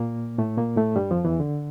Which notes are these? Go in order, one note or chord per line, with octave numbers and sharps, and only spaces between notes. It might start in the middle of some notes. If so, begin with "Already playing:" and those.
Already playing: A#2 A#3
A2 A3
A#2 A#3
A2 A3
G2 G3
F2 F3
E2 E3
D3